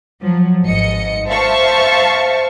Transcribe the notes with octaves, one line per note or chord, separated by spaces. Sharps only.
F3 F#3
G#1 G#2 D#5 C#7
C5 E5 F5 A5 C#6